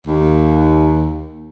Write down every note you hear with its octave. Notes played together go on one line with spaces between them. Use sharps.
D#2